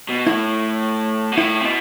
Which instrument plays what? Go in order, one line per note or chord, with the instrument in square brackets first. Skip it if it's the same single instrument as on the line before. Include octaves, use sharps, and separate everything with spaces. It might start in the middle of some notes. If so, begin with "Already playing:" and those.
[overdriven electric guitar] B2
[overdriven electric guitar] A2 [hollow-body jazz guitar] E4
[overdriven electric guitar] B2
[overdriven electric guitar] A2 [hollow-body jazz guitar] E4
[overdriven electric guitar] C3
B2